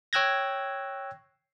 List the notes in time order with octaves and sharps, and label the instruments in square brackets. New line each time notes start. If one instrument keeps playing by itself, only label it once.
[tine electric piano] C#5 G5 E6 F#6 G#6 A#6